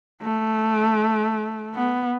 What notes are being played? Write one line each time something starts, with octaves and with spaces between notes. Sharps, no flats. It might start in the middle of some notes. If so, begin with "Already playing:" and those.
A3
B3